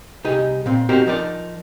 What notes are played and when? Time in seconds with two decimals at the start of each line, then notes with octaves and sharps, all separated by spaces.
0.24 C2 D#4 G4 G#4 D#5
0.66 A#2 C4
0.89 C4 D#4 F#4 G4 A#4 C5
1.07 F3 D#4 A#4 D5